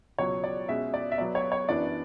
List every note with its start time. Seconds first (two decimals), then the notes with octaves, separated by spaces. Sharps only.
0.18 C#2 B2 F#3 C#5
0.44 D5
0.68 B2 G#3 C#4 E5
0.94 D5
1.11 E5
1.18 B2 F#3 B3 D5
1.35 C#5
1.52 C#5
1.68 F#2 E3 B3 D4 D5